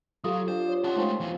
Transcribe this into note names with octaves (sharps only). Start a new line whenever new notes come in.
F#3 F4 G4 A4 D#6
D4 G4 C5
C#5
C#4 D#5 F#5 A5 C6
F3 G#3 A3 C4 D#4 E6
E2 E3